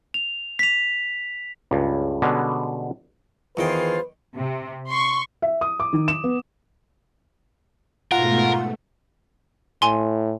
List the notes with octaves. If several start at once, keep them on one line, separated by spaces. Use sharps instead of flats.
F7
B6 F7
C#2 G2
B2 D3 G3 G#3 B3 C#4
E2 D#3 F4 G#4 B4 C5 G5
C3
C6 C#6
E5
D#6
D6
D#3
E7
B3
G#2 B2 A3 F4 A#4 F#5
A2 G#5 C6